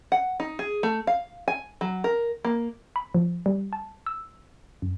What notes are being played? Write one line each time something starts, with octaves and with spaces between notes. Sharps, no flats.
F#5
D#4
G#4
A3
F5
G#5
F#3
A#4
A#3
B5
F3
G3
A5
E6
F#2